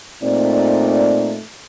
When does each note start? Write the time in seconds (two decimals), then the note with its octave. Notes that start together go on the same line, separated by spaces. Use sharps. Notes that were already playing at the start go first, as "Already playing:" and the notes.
0.22 A#2 A3 C4 D#4 D5